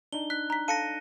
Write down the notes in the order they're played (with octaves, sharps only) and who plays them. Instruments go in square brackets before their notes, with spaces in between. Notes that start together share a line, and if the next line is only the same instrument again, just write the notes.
[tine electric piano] D4 D#4 [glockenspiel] G7
[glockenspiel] F#6 [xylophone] B6
[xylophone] A#5 B6
[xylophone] A4 F5 A5 [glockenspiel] A#6 C#7 D#7